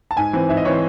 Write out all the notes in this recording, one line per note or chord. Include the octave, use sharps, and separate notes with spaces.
A5
G#2 G#5
E3 C4
G#2 E5
D#5
E3 C4 C#5
C5